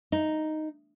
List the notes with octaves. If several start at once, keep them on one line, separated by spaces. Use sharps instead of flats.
D#4